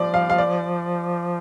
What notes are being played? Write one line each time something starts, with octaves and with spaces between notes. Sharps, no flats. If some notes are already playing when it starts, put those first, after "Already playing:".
Already playing: F3 D5
F5
F5
D5